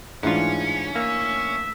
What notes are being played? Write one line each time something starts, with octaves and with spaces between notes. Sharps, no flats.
A1 G#2 E3 C#4 D4 F4
A#3 E5